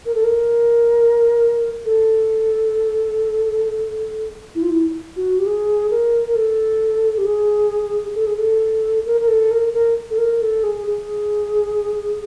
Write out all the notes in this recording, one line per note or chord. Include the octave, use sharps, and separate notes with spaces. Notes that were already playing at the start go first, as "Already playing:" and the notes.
A#4
A4
A#4
A4
E4
F4
E4
F#4
G4
G#4
A#4
A#4
A4
G4
G#4
A4
G#4
A4
A#4
A#4
A4
A#4
A#4
A4
A#4
A4
G#4
G#4